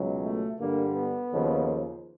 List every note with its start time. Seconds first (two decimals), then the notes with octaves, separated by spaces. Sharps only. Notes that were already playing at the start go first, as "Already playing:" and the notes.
Already playing: C#2 B2 F#3
0.24 A3
0.59 G2 D3 G3 A#3
0.95 B3
1.32 D#2 C#3 F3